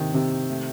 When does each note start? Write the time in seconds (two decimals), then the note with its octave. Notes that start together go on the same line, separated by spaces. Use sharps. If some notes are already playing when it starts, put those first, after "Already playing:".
Already playing: C3 D#3
0.14 C3
0.49 A3